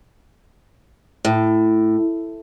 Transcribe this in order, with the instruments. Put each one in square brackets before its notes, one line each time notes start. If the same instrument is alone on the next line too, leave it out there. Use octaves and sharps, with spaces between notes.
[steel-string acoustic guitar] A2